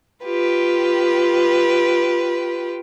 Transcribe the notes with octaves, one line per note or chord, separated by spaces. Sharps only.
F4 G4 B4